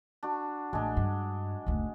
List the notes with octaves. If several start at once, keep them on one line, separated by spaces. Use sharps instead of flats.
D4 F#4
A1 G#3 D4
G2
F#1 D2